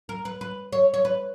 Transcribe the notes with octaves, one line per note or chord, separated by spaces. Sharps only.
A#4
B4
B4
C#5
C#5
B4